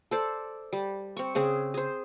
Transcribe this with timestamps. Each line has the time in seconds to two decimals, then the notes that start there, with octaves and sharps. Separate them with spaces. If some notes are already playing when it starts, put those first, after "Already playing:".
0.11 A4 C5 D5
0.73 G3
1.17 C4 C#6
1.35 C#3 C4 G#4
1.74 G#4 C5